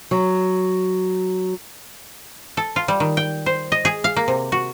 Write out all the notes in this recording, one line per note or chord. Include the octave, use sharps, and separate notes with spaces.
F#3
A4
F4
G3
D#3
G5
C5
D#5
G#4
F5
A#3
C3
F#4